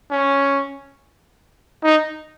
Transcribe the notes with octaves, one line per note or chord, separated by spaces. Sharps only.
C#4
D#4